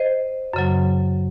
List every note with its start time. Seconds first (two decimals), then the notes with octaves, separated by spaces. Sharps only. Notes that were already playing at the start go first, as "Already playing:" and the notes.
Already playing: C5 D#5
0.54 F#2 C#3 F#3